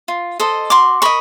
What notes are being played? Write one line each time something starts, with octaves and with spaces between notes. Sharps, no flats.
F4
A4 C5 D#5
F#4 C6 D6
A#4 D#5 B5 C#6